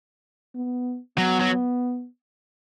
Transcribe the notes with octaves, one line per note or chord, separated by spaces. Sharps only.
B3
F#3 B3
F#3